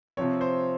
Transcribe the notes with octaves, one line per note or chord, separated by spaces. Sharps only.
C3 F3 C4 C#5
C5